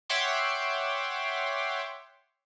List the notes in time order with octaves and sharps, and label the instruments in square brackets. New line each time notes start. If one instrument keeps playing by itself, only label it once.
[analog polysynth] C#5 E5 F#5 G5 C6 D6